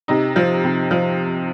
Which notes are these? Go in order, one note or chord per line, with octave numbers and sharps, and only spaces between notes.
C3 D#4
F3
C3
F3